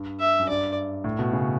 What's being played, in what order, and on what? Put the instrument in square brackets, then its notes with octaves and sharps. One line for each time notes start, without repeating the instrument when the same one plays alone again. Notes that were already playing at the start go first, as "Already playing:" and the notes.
Already playing: [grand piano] G2
[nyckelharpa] E5
[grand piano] F#2
[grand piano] G2 [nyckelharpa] D5
[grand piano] A2
B2
C#3